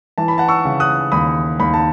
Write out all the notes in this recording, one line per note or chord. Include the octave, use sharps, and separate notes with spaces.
E3 A5
B5
F#5 A5
C#6 E6
C#3
D#6 F#6
D#2 B5 D#6
D#2 B5
A5